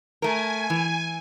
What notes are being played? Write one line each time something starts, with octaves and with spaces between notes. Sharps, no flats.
A3 A#4 G#5
E3